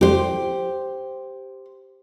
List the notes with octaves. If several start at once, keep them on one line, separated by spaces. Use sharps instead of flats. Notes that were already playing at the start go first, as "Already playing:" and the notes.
G4 C5